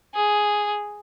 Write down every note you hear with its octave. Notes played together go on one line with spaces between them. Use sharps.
G#4